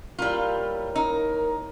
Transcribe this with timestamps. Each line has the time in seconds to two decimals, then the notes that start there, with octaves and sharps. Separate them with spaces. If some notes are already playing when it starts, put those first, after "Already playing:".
0.19 G3 A#3 E4 F4 E5
0.56 C#5 C#6
0.96 D#4 A#4